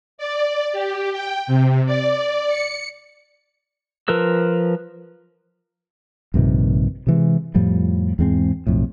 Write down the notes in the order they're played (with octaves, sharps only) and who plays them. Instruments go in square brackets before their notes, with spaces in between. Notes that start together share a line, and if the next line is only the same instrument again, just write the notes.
[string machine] D5
G4
G5
C3
D5
C#7
[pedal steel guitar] F3 A#4 B4 E6
[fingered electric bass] A#1 G2 C3 D#3
C3 E3 G#3
F2 A2 F3 G3
E2 G#2 G#3 C4
B1 F2 A2